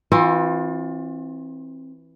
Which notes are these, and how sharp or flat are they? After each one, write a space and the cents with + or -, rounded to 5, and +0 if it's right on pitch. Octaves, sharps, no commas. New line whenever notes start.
E3 -10 C4 +20 F4 +35